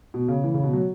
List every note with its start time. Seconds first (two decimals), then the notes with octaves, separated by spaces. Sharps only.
0.14 B2
0.28 C#3
0.44 E3
0.54 C#3
0.63 B2
0.73 F#3